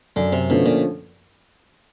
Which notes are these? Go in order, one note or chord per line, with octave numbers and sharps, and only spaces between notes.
F#2 D3
C3
B2 D3 F3 A3 C#4
A#2